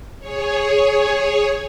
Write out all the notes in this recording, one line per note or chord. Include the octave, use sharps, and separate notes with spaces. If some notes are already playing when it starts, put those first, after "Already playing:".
G#4 C#5